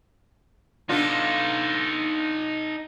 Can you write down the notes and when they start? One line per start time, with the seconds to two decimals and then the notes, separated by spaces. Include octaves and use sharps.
0.89 B3 D4 D#4 F4 A4